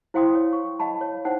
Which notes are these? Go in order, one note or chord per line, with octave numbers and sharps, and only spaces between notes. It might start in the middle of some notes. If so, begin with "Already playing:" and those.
E4 C5 F5 G5 C6 D#6
C#5
C#6
D#5 F5 G5 A5 B5
C#5
D#4 C5 F#5 G5 A5